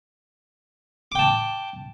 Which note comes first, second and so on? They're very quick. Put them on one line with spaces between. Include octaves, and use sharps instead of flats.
D6 G5 A5